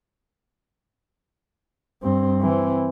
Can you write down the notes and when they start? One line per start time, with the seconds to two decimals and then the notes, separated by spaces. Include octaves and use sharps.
2.03 G2 C4
2.42 E3 C4